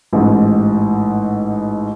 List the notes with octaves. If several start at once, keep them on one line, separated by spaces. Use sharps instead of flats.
A1 G#2